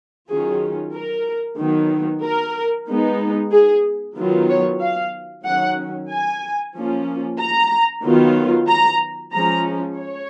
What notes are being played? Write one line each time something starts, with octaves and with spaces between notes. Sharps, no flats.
D#3 F#3 C#4 F4 G#4
A#4
D#3 F#3 B3
A#4
G#3 B3 D#4
G#4
D#3 F#3 B3 F4
C#5
F5
D#3 F#3 C#4 F#5
G#5
F3 A#3 C#4 F4
A#5
D#3 F#3 B3 F4
A#5
F3 G#3 C#4 A#5
C#5